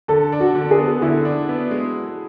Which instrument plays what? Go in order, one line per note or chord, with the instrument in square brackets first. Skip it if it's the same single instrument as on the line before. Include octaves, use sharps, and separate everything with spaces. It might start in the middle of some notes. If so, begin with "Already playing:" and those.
[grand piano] D3 [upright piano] A4
[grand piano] D4
[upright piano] F#4
[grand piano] D3
[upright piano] G#4
[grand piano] B3
[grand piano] D3 [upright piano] E4
[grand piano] D4
B3
G#3